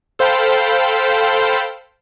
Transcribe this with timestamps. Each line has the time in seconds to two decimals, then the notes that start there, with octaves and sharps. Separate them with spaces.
0.19 A4 C5 F5 G5 B5